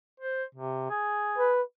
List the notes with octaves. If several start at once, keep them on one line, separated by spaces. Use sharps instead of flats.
C5
C3
G#4
B4